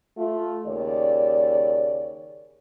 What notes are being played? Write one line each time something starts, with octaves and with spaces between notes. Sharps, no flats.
A3 F4
D#2 C#3 C#5 D5